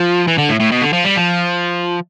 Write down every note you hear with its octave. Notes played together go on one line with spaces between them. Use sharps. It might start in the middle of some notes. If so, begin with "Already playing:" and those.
Already playing: F3
E3
D3
A2
A2
B2
D3
F3
G3
F3